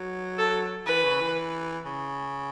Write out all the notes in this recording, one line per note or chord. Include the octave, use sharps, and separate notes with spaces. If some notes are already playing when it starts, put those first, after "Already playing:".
Already playing: F#3
A4
E3 B4
C#3
E3
C#3